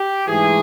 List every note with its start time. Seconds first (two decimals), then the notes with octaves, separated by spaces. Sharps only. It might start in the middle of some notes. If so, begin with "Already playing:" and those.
Already playing: G4
0.27 G#2 E3 A3 G#4